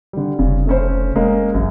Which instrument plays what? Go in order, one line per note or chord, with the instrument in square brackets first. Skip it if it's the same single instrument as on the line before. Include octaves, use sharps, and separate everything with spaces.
[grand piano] D3 G3
[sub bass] F1 [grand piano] C#3
[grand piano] A3 C#4 C5
G#3 A#3 C#4
[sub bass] A1 [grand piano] F#2